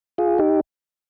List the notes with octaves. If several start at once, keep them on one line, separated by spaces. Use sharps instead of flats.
F4 G#4
D#4 G4